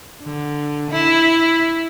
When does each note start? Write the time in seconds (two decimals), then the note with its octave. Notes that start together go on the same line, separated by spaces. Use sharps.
0.23 D3
0.91 E4